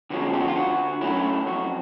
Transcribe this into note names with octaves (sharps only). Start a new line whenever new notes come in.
D3 F3 G#3 C#4 F#4
G4
F#4
F4
D3 F#4
F#3 A3 C#4 E4
F2 F#4